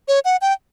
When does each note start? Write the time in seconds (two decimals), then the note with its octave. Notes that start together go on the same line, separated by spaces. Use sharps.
0.08 C#5
0.25 F#5
0.41 G5